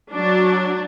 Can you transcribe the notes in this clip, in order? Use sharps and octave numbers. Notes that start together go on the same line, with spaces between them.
F#3 D4